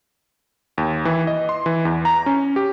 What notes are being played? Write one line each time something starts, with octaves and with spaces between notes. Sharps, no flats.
D#2
E3
D#5
C6
E3
E2
A#5
C#4
G4